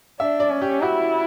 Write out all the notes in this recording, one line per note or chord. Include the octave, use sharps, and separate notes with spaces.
D4 E5
D5
C#4
G4
E4 F#4